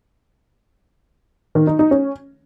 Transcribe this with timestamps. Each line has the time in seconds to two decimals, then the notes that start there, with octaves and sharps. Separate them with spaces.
1.55 D#3
1.67 D#4
1.79 D#4
1.91 C#4